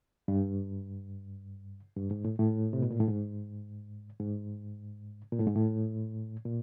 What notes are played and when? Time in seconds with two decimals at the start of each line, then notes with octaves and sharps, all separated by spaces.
0.28 G2
1.96 G2
2.11 G#2
2.25 A2
2.39 A2
2.73 C3
2.82 B2
2.91 A#2
3.00 A2
3.08 G#2
4.20 G#2
5.32 A#2
5.39 A2
5.47 G#2
5.55 A2
6.45 A#2